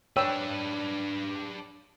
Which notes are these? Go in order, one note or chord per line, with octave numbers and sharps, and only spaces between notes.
D4 B4 C#5 G5 E6